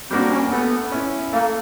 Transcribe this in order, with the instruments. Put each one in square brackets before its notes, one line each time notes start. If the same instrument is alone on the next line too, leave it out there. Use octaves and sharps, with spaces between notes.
[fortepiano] G3 A#3 D4 F#4 [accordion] C4
[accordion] C#4
[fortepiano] A3 [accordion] B3
[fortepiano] C#4 E4
[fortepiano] A3 [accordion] A#3